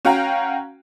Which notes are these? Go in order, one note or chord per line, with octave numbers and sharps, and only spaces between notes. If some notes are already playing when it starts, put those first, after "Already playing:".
C#4 F#4 F5 G5 A#5